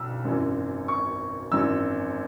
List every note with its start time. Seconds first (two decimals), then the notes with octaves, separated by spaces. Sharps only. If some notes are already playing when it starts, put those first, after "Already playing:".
Already playing: B1 E6
0.25 G#1 F#2 E3
0.88 C#6
1.52 G#1 F#2 E3 E6